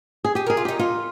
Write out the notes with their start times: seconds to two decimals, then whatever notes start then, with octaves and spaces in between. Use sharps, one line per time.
0.24 G#4
0.35 G4 G#4
0.47 A#4
0.50 G#4
0.57 F4
0.65 D#4 G4
0.79 D#4 F4